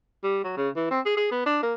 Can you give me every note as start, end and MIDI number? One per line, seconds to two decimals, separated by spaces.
0.24 0.39 55
0.44 0.57 54
0.57 0.69 49
0.76 0.86 52
0.91 1.00 60
1.06 1.16 68
1.17 1.28 68
1.31 1.45 59
1.46 1.59 62
1.63 1.74 58